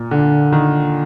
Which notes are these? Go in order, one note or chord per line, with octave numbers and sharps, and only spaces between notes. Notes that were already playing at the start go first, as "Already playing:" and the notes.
Already playing: A#2
D3
D#3